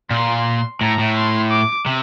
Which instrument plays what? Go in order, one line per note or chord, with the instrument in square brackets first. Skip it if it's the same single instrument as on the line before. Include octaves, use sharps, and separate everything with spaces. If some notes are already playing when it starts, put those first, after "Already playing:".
[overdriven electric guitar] A#2 [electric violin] C6
[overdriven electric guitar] A2 [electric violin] A#5
[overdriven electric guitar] A2
[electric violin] C6
D6
[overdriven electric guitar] C3